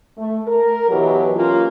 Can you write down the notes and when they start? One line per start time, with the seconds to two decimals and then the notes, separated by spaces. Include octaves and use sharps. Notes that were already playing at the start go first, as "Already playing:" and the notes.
0.18 A3
0.47 A#4
0.89 B2 E3 F#3 G4
1.35 A#3 C#4 F4